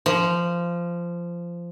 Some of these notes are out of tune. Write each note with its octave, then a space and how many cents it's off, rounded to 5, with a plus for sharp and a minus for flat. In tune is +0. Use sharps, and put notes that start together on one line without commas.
F3 -15